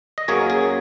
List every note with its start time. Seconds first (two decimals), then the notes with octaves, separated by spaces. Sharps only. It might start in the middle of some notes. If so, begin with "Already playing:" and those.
0.18 D#5
0.28 F#2 F#3 A#3 C#4 G#4 C#5
0.50 G#4